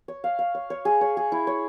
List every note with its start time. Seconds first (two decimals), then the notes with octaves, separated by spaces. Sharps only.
0.08 C#5
0.24 F5
0.39 F5
0.55 C#5
0.70 C#5
0.85 G#4
1.01 C#5
1.17 G#4
1.32 E4
1.47 C#5